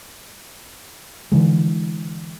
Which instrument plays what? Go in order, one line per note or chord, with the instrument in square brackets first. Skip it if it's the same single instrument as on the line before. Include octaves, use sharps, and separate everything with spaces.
[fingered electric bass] D3 E3 G#3